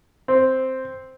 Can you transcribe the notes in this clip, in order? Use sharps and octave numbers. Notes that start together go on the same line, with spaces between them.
C4